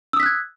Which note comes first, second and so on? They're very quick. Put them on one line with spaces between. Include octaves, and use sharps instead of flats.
E6 D#6 B6 F#6 G#6